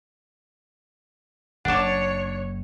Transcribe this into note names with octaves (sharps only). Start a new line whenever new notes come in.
F#1 D4 C#5 F#5 A5 D6